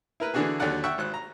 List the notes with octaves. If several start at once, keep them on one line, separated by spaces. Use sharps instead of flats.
E4 A#4 B4
D3 E3 D4 F#4 G#4
D#2 D3 F#3 D5 F#5
E5 F#5 G5 C#6
G#1 F#6
A#5